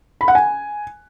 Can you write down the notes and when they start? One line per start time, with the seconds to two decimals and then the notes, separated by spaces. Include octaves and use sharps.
0.21 B5
0.28 F#5
0.35 G#5